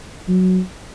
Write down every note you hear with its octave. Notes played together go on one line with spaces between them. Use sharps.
F#3